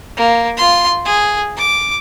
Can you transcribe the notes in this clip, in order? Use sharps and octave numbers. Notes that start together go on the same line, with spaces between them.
A#3
F4 C6
G#4
D6